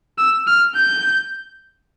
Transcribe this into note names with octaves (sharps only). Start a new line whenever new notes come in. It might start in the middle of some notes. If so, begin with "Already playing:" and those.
E6
F6
G6